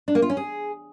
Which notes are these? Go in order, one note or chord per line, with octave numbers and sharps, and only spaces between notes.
D4
A#3
F4
C#4
G#4